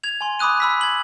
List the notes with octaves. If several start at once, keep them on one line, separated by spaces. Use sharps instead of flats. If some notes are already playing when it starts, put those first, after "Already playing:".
G#6 F7
G#5 C6
B5 D6 D#6 F#6 D#7
B5 E6 B6
G#6 F#7